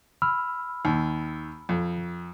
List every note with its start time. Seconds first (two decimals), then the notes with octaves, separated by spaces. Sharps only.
0.22 B5 E6 F6
0.85 D#2
1.69 F2